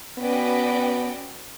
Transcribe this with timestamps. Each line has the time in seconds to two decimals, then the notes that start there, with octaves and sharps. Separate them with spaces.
0.18 B3 C#4 F#4 B4 D5 G5